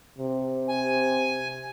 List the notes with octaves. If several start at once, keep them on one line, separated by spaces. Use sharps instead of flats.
C3
G#5